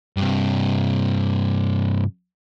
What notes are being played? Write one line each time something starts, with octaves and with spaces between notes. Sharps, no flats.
G2 C3